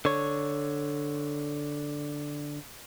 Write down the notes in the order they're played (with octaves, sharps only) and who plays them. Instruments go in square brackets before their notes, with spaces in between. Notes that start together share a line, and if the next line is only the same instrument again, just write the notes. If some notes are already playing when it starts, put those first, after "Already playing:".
[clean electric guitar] D3 C#5